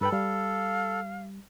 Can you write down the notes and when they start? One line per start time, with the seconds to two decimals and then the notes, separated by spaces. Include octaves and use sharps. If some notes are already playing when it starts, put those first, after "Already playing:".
0.01 G2 A4 B4 G5 B5
0.12 G3 F5